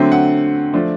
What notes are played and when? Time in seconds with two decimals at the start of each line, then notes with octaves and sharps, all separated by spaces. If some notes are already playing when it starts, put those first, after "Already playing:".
Already playing: D3 F#3 A3 C4
0.12 F#5
0.73 F3 A3 D4